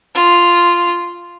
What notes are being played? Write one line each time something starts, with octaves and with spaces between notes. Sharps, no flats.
F4